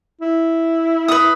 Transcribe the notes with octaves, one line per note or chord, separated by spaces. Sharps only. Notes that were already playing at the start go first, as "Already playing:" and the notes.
E4
B4 D#6